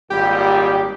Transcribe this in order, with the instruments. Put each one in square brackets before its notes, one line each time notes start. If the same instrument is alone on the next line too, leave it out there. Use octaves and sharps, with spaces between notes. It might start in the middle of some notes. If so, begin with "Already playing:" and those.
[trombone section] G#1 A#2 G3 [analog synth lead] G4